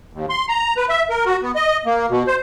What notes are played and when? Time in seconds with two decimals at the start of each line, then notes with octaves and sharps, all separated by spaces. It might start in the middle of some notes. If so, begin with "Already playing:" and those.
0.13 D#2
0.30 C6
0.49 A#5
0.77 B4
0.89 E5
1.10 A#4
1.26 F#4
1.42 B3
1.56 D#5
1.86 A#3
2.10 B2
2.27 C5